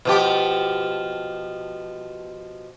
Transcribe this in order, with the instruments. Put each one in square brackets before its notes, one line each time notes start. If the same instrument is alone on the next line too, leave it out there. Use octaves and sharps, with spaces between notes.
[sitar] B2 F3 G4